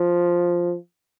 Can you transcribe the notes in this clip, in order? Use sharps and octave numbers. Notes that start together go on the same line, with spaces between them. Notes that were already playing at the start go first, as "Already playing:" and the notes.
Already playing: F3